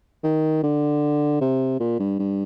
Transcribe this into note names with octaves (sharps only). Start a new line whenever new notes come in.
D#3
D3
C3
A#2
G2
G2